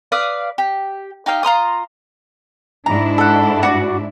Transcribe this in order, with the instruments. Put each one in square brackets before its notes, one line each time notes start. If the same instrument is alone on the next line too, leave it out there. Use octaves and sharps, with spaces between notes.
[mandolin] B4 D5 F5 D#6
G4
D#4 G4 F5 G5
F4 A#5 C6 D#6
[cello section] G#2 D4 E4 [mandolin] A#5
[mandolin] A4 F#5
F#4 D5